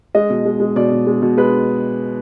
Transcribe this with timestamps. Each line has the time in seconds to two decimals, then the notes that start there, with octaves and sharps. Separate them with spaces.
0.15 G#3 D#5
0.30 B2
0.45 G#3
0.60 G#3
0.76 B2 D5
0.91 B2
1.07 G#3
1.22 B2
1.37 G#3 B4